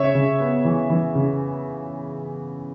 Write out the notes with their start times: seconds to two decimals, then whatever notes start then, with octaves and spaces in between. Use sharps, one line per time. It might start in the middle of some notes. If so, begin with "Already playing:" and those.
Already playing: C#3 C#5 E5
0.15 C#3
0.40 B3
0.65 E3
0.90 E3
1.15 C#3